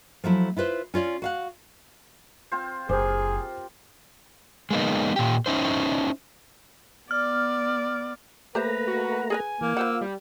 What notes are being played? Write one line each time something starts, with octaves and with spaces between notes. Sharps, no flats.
F3 F#3 A3 E4
E4 F4 B4 C5
C#4 F4 C#5 D5
F#4 F5 F#5
C4 F4 C5
F#1 G4 G#4 A#4 C5
G#3 A#3 B3 D#4
A#2 G4
C#4 D#4 E4 C5
B3 D5 F6
A3 A#3 G4 B4 C5 E5 A#5
F#4
G#4 A#4 B4 G#5
E3 A#3
F4 B4 C5 F#5 E6
G3